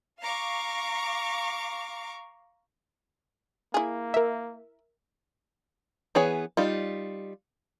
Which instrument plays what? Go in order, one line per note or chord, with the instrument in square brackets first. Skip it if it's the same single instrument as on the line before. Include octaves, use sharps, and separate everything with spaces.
[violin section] F5 A#5 C#6 D6
[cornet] A#3 [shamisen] E4 G#4
[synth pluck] A#4 E5
[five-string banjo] E3 B3 G#4 C#5 G#5
G3 D#4 F4